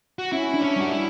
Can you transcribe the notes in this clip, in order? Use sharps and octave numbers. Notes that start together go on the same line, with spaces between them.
F#4
C#4 E4
D4
C#4
G3
F#4
E4